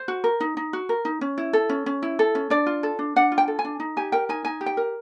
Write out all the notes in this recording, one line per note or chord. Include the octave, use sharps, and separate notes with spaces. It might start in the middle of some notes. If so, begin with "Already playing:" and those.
Already playing: C5
F#4
A#4
D#4
D#4
F#4
A#4
D#4
C#4
E4
A4
C#4
C#4
E4
A4
C#4
D4 D5
F4
A4
D4
D4 F#5
F4
G5
A4
G#5
D4
D#4
G4 G#5
A#4 G5
D#4 G#5
D#4 G#5
G4
G5
A#4